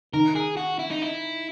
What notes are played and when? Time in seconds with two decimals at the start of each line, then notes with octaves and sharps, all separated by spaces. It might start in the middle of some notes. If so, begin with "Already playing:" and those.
0.13 D#3 A#4
0.35 G#4
0.57 F#4
0.79 E4
0.91 D#4
1.02 E4